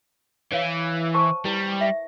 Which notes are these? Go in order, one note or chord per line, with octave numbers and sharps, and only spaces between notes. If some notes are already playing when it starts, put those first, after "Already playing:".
E3 C#5 F5
C5 A5 C#6
G3 E4 B4
E5